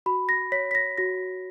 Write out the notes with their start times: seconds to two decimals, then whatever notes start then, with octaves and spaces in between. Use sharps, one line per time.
0.06 F#4 B5
0.29 A#6
0.52 C#5 B6
0.71 B6
0.75 A#6
0.98 F#4 A#6